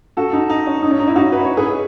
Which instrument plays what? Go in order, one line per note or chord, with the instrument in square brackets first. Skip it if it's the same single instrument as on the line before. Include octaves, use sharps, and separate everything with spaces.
[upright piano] F#4 A4
D#4
D#4
C#4
D#4
C#4
D#4
C#4 E4
D#4 F#4
B4
C#5
G#4 B4